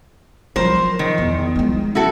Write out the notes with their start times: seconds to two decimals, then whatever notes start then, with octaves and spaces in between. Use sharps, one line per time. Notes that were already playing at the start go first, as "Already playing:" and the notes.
0.56 F3 F#3 A#4 C5
0.99 D#3
1.18 E2
1.55 F3 G#3
1.95 E4 F#4 A4